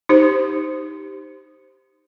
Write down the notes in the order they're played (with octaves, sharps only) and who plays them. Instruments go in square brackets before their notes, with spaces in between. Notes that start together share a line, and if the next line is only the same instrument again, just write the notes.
[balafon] D#4 G4 C5